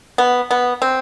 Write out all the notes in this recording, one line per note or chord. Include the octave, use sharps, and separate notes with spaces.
B3
B3
C4